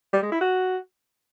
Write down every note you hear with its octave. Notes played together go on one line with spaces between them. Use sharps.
G3
G#3
E4
F#4